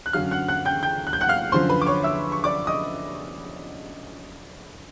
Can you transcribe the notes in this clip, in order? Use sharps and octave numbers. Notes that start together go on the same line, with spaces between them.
F#6
F#2 D3 F#3 F5 F6
F#5 F#6
F#5 F#6
G5 G6
G5 G6
F#6
G6
F#5 F#6
F5 F6
F#2 D3 F3 C5 C6
B4 B5
D6
C#5 C#6
E5 E6
C#6
D5 D6
D#5 D#6